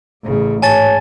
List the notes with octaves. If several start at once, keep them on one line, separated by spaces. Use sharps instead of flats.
A1 C#3
G#2 C#5 G#5 A5 A6